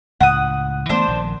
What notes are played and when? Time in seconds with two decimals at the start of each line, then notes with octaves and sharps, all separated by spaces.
0.21 C#2 A2 F#5 D#6
0.89 E3 A3 B3 D4 C5
1.08 A#1 D#3